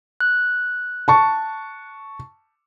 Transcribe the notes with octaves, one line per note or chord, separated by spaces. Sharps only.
F#6
A5 C#6